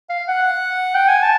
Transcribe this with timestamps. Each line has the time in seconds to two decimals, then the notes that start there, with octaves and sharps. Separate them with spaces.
0.10 F5
0.28 F#5
0.95 G5
1.09 G#5
1.23 A5